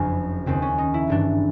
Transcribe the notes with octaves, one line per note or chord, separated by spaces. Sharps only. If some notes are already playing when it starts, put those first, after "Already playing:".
Already playing: F#1 F2 C#3 F3 D4
D#2 C#3 F3 C4
C#4
D#4
E4
G#1 G2 E3 D4